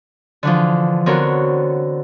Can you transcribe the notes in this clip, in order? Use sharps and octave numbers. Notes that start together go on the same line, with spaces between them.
D3 E3 F3
D3 B3 C4 F#4 A#4 C#5